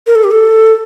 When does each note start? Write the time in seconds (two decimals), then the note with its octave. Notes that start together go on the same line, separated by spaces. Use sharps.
0.07 A#4
0.15 A4
0.24 G4
0.31 A4